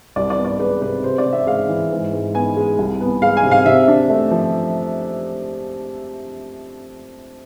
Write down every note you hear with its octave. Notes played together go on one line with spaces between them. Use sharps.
C2 D5
D5
B3
D5
G#3 B4
C3 B4
C3 C5
D5
C3
E5
G#3 F5
E3
G#2
G#2
B3 G#5
G#3
C2
B3
G#3 F5
G#5
C3
F5
C3 E5
D4
A3
F3